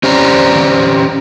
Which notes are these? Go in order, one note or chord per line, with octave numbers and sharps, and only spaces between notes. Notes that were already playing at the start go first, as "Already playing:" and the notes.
C#4 G4 C5 D5 A#5